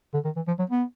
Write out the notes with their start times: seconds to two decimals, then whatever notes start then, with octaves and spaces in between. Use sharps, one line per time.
0.14 D3
0.25 D#3
0.36 E3
0.48 F3
0.59 F#3
0.70 B3